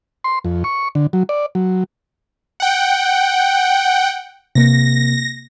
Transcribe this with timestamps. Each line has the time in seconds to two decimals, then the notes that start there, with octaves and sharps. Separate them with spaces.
0.24 C6
0.45 F2
0.64 C#6
0.95 D3
1.13 F#3
1.29 D5
1.55 F#3
2.60 F#5 G5
4.55 C3 A#3 A#6